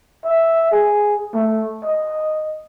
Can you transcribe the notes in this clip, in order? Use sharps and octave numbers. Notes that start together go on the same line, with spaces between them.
E5
G#4
A3
D#5